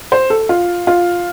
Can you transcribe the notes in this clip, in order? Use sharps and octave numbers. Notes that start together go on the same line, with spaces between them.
C5
A4
F4
F4